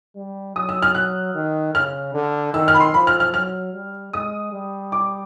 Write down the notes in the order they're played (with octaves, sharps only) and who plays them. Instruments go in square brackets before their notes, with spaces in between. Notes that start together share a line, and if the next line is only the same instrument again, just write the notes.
[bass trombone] G3
[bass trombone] F#3 [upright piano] D#6
[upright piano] E6
F6
F#6
[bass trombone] D#3
[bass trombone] C#3 [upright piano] F6
[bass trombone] D3
[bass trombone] D#3 [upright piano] E6
[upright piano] F6
B5
C6
[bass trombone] F3 [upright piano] B5
[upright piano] F6
F6
[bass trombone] F#3 [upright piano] F6
[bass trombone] G3
[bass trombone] G#3 [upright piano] D#6
[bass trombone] G3
[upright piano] D6